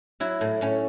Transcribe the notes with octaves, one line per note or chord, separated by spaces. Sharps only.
F#3 E4
A2
A2 C#4